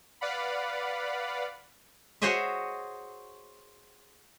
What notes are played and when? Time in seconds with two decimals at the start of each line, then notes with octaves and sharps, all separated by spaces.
0.21 B4 D5 F5 F#5 B5
2.22 F#4 G#4 C5 C#5 D#5 E5